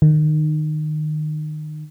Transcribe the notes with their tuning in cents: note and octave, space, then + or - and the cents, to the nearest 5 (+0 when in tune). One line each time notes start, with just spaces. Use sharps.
D#3 -25